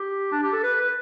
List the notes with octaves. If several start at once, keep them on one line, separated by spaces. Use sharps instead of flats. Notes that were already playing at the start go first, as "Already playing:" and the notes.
Already playing: G4
D4
G4
A4
B4
B4